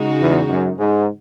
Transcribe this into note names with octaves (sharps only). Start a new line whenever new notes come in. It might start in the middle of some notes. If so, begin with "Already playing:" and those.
Already playing: C#3 G#3 D#4 F#4
E2
F#2
G#2